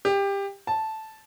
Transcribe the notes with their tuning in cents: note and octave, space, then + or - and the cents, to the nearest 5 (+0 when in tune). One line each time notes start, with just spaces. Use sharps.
G4 +20
A5 -5